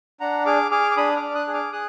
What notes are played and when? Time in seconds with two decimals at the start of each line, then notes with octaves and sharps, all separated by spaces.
0.20 D4 F#5 A#5
0.46 G#4 D6 F6
0.71 G#4 D6 F6
0.91 D6
0.97 D4 B5 D#6
1.16 D6 F6
1.22 D4
1.35 D#6 F#6
1.48 G#4
1.54 D6 F6
1.72 G#4 D#6 F#6